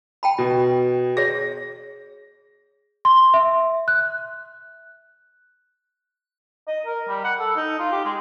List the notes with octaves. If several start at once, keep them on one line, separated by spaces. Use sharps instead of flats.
G5 A5 B5
B2
G#4 C#5 A#6
C6
E5
F#6
D#5
A#4
G3
F#5
A4
D#4
F4
G4
G#3